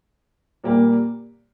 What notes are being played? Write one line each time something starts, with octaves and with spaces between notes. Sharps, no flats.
A#2 G3 A#3